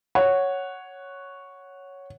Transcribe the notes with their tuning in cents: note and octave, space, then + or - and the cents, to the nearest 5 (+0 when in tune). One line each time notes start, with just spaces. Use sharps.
C#5 +0 F#5 +0